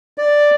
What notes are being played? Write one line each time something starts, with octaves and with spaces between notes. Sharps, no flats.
D5